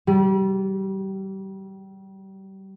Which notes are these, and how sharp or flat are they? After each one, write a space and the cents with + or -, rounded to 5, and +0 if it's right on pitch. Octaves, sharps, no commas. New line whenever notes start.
G3 -30